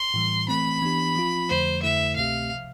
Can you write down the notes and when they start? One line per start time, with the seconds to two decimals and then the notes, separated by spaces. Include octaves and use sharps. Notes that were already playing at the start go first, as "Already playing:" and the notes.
Already playing: C6
0.14 A2 E3 G3
0.48 E3 A3 C4 B5
0.82 E3 B3 D4 G4
1.16 F3 C4 F4
1.49 F2 D3 F3 A3 C5
1.83 F2 D3 A3 E4 A4 E5
2.16 C2 B2 A3 C4 G4 F5
2.51 C3 F3